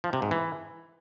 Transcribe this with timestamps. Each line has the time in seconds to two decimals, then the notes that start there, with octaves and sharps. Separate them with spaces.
0.04 F3
0.13 C3
0.22 G#2
0.31 E3